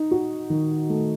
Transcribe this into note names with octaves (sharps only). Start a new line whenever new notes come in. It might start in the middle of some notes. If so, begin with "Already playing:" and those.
Already playing: D#4
F#4
D#3
A3